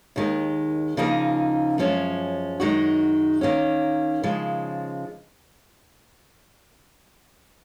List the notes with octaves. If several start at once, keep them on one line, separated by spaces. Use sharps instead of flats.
D#2 D#3 G#3
C#3 F3 A#3 D#4 G#4
F#2 F3 G#3 C#4
F#2 D#3 G#3 D#4 F#4
D#3 A#3 C#4
C#3 F3 G#3